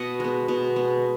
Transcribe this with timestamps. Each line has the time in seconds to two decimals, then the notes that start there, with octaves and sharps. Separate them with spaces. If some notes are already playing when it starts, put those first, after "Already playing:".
Already playing: B2 D#5 F#5
0.20 G#3 B3
0.48 B2
0.76 G#3 B3